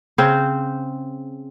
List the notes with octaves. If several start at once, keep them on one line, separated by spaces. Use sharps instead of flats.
C#3 C4 C5